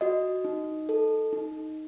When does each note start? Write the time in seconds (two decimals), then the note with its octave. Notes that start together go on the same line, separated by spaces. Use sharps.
0.01 F#4 D#5
0.45 D#4
0.89 A4
1.33 D#4